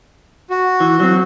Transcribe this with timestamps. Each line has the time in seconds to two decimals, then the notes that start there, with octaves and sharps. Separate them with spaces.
0.50 F#4
0.80 E3
1.00 F#3 C4